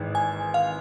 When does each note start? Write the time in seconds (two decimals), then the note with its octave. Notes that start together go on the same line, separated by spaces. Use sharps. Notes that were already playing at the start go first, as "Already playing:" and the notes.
Already playing: G#1 G#2 E3
0.15 G#5
0.54 F5